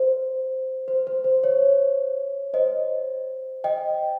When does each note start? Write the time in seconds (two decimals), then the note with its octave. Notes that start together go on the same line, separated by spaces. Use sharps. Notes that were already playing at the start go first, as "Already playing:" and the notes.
Already playing: C5
0.88 C5
1.07 C5
1.24 C5
1.44 C#5
2.54 C5 D#5
3.64 D#5 G5